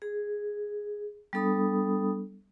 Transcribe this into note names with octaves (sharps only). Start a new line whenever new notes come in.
G#4
G3 B3 D4 A4 B5 D#6